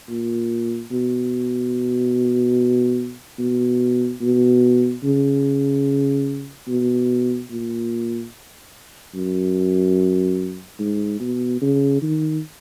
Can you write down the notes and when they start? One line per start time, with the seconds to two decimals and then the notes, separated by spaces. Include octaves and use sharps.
0.09 A#2
0.91 B2
3.39 B2
4.21 B2
5.04 C#3
6.68 B2
7.51 A#2
9.14 F#2
10.79 G#2
11.20 B2
11.62 C#3
12.02 D#3